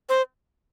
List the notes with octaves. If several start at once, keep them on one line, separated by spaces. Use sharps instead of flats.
C5